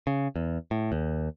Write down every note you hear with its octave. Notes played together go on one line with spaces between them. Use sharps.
C#3
E2
A2
D#2